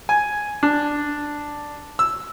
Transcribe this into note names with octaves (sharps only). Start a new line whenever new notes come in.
G#5
D4
E6